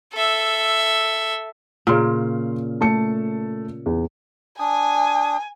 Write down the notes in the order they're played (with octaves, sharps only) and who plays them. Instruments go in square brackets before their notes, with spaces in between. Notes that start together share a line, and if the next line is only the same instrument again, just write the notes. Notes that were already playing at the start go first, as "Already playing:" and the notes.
[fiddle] A4 E5
[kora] A#2 C#3 [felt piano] C6 F6
[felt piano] A3 A5 C#7
E2
[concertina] D4 D#6 [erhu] G#5